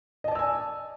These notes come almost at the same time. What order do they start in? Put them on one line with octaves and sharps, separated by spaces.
D#5 A5 D5 E6 G#5